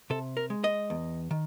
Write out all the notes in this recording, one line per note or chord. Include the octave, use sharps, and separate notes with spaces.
C3 A4
A#4
G#3
D#5
E2
D#3